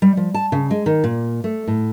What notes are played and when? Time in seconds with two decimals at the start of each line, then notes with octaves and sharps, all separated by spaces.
0.02 G3
0.17 F3
0.34 A5
0.52 C#3
0.71 G#3
0.86 D#3
1.04 A#2
1.44 A3
1.68 A2